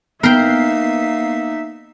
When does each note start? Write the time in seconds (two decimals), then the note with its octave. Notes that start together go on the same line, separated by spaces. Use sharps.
0.23 A#3 B3 D#4 A#4 E5 G5 C7